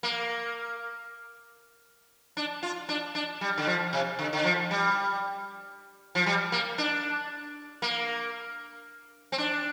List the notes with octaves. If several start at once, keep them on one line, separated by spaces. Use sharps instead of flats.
A#3
D4
F4
D4
D4
G3
D3
F3
C3
D3
D3
F3
G3
F3
G3
A#3
D4
A#3
C4
D4